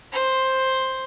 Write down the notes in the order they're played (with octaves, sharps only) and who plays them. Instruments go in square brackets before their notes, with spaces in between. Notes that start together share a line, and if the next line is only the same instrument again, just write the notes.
[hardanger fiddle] C5